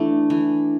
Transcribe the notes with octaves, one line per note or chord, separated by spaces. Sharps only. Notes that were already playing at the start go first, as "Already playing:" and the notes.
Already playing: E3 A3 D4
E3